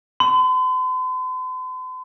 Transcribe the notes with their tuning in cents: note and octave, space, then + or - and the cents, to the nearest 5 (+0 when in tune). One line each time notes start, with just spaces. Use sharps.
C6 -45